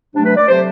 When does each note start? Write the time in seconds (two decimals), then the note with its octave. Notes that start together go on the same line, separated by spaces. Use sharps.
0.15 C3 F#3 A3 D4
0.26 B4
0.37 D5
0.48 C3 F#3 A3 C5